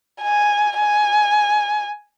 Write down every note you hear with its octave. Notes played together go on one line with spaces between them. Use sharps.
G#5
G#5